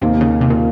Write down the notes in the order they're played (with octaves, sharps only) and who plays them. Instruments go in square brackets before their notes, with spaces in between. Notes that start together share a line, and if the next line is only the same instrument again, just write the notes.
[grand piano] D#2 D#3 A#3 D#4 [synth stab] C3
[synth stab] C#3
C3
A#2